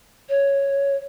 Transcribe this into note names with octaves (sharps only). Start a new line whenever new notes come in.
C#5